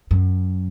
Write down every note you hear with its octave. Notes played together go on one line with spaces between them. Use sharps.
F#2